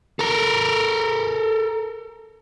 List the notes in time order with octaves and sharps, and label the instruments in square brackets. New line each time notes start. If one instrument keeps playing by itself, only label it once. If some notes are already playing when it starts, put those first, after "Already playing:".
[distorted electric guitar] A4 A#4